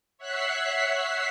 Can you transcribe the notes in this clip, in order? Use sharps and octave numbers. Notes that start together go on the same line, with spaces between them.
C#5 E5 F#5 F#6 B6 C7